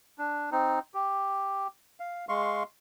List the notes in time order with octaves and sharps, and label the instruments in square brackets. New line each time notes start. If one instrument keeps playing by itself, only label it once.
[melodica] D4
C4 D#4
G4
F5
G#3 F5 C6 C#6